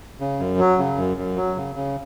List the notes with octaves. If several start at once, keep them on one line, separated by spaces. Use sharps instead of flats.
C#3
F#2
F#3
C#3
F#2
F#2
F#3
C#3
C#3